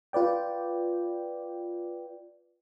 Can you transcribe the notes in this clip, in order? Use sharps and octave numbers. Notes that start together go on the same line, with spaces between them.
F4 B4 D5 G5